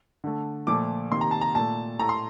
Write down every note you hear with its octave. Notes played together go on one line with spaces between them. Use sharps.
D3 A3
A#2 F3 A3 D6
C3 D#3 A#3 C6
A#5
A5
A#5
A#2 A3 A5
A2 A3 A#5
C6